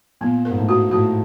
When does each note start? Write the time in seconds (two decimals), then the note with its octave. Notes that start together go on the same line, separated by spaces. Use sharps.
0.21 A#2 B3
0.45 G#2 A#4
0.57 A2
0.69 F#4
0.91 A2 F#4